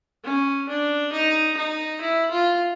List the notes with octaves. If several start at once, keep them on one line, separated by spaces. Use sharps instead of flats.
C#4
D4
D#4
D#4
E4
F4